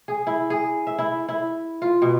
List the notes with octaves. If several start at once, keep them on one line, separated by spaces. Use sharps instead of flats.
G#4
E4
G#4
E5
E4
E4
F4
B2